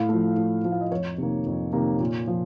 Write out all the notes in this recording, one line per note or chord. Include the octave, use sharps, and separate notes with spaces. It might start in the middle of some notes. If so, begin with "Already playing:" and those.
Already playing: A2 F5
F3 A3
A2
F3 A3
F5
D#5
F2 C#5
C3 D#3 A#3
F2
C3 D#3 A#3
A#2
F3